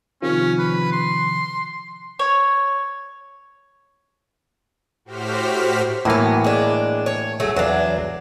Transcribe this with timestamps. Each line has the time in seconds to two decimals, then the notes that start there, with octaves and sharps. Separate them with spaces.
0.22 C3 D#3 F3 C#4
0.59 B4
0.92 C6
2.19 C#5
5.05 A2 F#4 G4 C5 F6 B6
6.05 A2 E3 F#3 A#3 B3
6.44 G#3 D4
7.06 C#5
7.40 F#3 A3 G#4
7.56 E2 F#3 D4 D5 F5